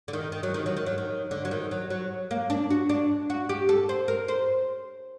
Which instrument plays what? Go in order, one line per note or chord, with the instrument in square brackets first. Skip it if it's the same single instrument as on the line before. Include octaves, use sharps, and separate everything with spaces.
[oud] D3
D#3
D#3
F#3
D#3
F#3
D#3
F#3
D#3
D3
F#3
D#3
F#3
F#3
A#3
D4
F#4
D4
F#4
G4
A4
C5
A#4
C5